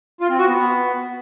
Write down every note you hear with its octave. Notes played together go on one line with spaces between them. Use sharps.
F4
C4
F#4
B3